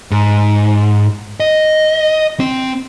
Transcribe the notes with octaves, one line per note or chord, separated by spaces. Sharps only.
G#2
D#5
C4